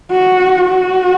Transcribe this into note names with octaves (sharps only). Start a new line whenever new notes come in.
F#4
F#4